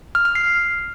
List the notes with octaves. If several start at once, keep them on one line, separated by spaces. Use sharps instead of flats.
F6
F6
C7